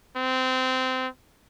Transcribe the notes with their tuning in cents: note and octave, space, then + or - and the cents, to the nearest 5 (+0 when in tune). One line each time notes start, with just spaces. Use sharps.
C4 -20